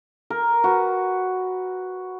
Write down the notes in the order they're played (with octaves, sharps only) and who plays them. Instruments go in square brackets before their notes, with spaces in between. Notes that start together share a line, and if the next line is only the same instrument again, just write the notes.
[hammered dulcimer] A#4
F#4 B4